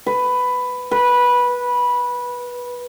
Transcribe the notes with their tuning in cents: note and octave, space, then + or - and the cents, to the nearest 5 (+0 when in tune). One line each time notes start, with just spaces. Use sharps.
B4 +10
B4 -15